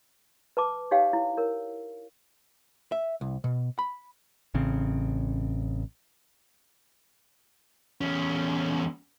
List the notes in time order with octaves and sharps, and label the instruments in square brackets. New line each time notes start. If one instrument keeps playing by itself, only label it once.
[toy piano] B4 A5 D6
D#4 G4 C#5 F5 G5
E4
A#4 C#5
[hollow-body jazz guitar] E5
C2
B2
B5
[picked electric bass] A1 C#3 C4
[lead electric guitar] E2 C#4